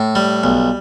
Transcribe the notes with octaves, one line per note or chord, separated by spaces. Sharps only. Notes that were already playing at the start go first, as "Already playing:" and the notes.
Already playing: A2
G3
B1